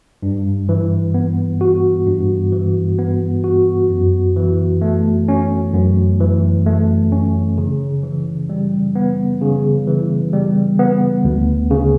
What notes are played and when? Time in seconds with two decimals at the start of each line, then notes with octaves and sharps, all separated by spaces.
0.22 G2
0.69 E3
1.14 B3
1.61 F#4
2.07 G2
2.52 E3
2.99 B3
3.44 F#4
3.90 F#2
4.36 E3
4.81 A3
5.28 C#4
5.74 F#2
6.20 E3
6.66 A3
7.12 C#4
7.58 C#3
8.03 E3
8.49 G3
8.95 B3
9.42 C#3
9.87 E3
10.33 G3
10.79 B3
11.25 D2
11.71 C#3